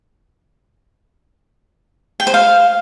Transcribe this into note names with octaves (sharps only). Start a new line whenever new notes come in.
G5
C5
F5